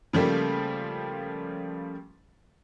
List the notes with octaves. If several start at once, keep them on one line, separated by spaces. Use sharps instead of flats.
C#3 F3 G3 A3 A#3